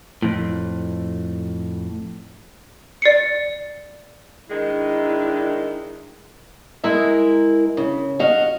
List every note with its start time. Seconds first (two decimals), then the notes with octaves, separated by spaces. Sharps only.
0.22 F2 A2
3.02 D5 C7 C#7
4.50 D#3 G#3 D4 E4
6.84 G#3 E4 A#4 E5
7.77 C#3
8.19 F#4 D#5 F5